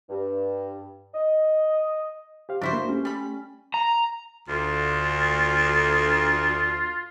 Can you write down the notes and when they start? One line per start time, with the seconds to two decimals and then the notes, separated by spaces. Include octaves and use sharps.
0.10 G2
1.14 D#5
2.49 G4 C5 F5
2.61 G2 C#3 F3 D4 E4 F#4 C5
2.73 A#3
2.89 A3 C#4 G4
3.05 G3 B5
3.74 A#5
4.49 D2 F4